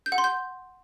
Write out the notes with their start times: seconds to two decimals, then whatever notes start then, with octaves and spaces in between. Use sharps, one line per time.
0.06 G6
0.12 F#5
0.18 C6
0.24 G6